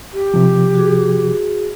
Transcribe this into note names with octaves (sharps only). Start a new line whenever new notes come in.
G4
C3 F3
F#4 G#4